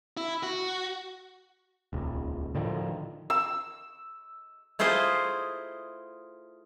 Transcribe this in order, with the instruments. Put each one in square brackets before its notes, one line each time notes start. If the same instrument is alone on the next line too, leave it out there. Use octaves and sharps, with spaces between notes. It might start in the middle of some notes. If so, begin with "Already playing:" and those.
[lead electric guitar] E4
F#4
[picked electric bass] D#1 C#2
A2 D3 D#3 F3
[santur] E6
[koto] A3 E4 F4 G#4 C5 D#5